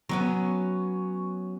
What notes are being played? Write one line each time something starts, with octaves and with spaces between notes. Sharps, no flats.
F#3 B3 C#4